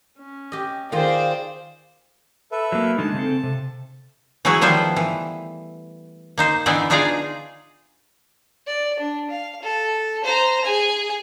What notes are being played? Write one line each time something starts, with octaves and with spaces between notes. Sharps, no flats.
C#4
G4 D#5
D#3 F4 G#4 C5 D5 D#5 F5 G5
A4 B4 E5
F#3 A#3
D3 G#3 D#4 A5
C#3 C4 A4
C3
E3 F#3 A3 E4 F#4 G#4
D#3 F3 G3 B3 C5
E3
A#3 D#4 C5
D3 E3 B3 D#4 E4 D5
D4 D#4 F4 G#4 D5 A#5
D5
D4
F5
A4
C5 A#5
G#4 G#5